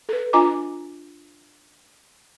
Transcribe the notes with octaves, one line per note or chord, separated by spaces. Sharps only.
A4 B4
D4 F4 D#5 G#5 A#5 D6